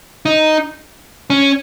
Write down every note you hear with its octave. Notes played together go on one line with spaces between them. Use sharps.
D#4
C#4